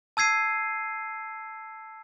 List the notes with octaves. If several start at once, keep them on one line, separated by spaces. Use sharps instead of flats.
A5 E6 G#6 C7 D#7